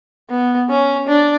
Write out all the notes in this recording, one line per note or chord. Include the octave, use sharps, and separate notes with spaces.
B3
C#4
D4